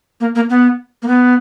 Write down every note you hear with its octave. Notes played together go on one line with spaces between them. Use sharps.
A#3
A#3
B3
A#3
B3